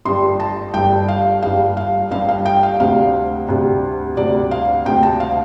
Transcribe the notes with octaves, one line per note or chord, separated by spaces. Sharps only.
G1 G2 G3 C6
A5
G1 G2 G3 G5
F5
G1 G2 G3 F5
F5
G1 G2 G3 F5
F5
G5
F5
D2 C3 G3 F5
D2 C3 G3
D2 C3 G3 D5
F5
D2 C3 G3 G5
A5
F5